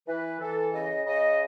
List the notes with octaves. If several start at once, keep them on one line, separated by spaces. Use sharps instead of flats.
E3 B4
E3 A4
C#3 D#5
C#3 D#5